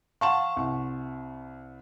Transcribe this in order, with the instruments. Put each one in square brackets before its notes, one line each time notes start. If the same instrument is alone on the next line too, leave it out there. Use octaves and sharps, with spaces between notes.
[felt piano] F5 A5 E7 [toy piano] F#5 C6 C#6
[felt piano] C2